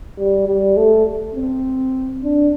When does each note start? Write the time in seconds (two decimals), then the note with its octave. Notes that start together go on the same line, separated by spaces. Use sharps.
0.19 G3
0.47 G3
0.77 A3
1.35 C4
2.23 D4